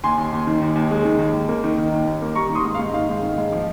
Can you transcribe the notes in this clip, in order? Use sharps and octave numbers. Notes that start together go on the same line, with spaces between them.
D#2 G#5 C6
D#2
D#2
D#3
D#2
D#2
G#3
D#3
D#2
D#2
A#3
D#3
D#3
D#2
D#2
A#3
G3 A#5 C#6
D#3
C6 D#6
G#2
F5
G#2
D#3 F5
G#2
D#3
G#2
F3